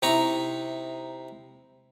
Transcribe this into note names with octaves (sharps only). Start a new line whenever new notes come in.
C3 D#4 E4 A#5 C#6